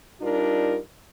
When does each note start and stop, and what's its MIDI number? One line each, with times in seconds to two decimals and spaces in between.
0.21 0.77 55
0.21 0.77 62
0.21 0.77 63
0.21 0.77 65
0.21 0.77 70